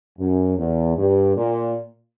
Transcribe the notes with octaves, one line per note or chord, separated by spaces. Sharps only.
F#2
E2
G2
A#2